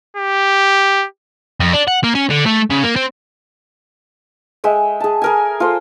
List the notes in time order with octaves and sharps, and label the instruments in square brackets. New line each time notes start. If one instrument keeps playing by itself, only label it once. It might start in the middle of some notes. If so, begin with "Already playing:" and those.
[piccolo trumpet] G4
[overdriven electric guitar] F2
D4
F#5
A#3
C#4
D3
A3
C#3
A#3
C4
[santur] G#3 E5 G5
G#4 A5
G#4 A#4 G#5
F4 A4 C5